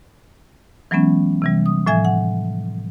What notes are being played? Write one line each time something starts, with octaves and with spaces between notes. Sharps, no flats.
E3 F#3 G#3 B3 C#4
C3 E3 G3
D#6
A2 F3 E5 G#5 G#6
F#5